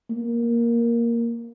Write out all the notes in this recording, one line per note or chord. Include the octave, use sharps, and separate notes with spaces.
A#3